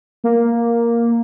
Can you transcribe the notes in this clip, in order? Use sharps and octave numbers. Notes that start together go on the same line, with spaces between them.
A#3